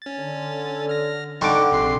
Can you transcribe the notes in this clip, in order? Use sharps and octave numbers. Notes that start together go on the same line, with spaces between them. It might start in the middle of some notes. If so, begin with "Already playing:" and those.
C#4 A6
D3
F6 A#6
D3 G3 D#4 F#5 C#6 D6
A#1 C3 G#4 C6 C7